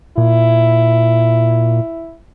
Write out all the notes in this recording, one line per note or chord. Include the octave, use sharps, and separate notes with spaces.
A#2 E4